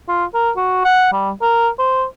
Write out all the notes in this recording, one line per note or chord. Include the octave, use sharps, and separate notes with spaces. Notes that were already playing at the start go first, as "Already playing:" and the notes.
F4
A#4
F#4
F#5
G3
A#4
C5